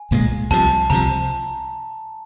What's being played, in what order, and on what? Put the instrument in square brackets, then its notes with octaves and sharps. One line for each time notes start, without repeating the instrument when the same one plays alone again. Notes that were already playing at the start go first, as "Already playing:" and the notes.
Already playing: [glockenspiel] G#5
[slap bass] C2 A#2 F3 G#3
[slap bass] C2 C3 F3 [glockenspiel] A5
[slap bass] C2 C3 F3 [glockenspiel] A#5